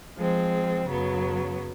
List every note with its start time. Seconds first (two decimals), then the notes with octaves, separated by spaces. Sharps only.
0.17 F3 G#3 C4
0.87 F#2 C#3 F#3 B3